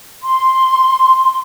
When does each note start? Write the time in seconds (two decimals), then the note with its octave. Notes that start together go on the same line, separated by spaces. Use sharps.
0.23 C6